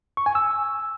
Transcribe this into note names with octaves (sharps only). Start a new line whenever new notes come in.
C#6
G#5
E6